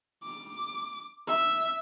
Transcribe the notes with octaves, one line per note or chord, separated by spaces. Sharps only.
D6
E5